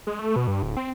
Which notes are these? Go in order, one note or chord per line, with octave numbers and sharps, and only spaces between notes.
G#3
A3
B2
G2
D1
C4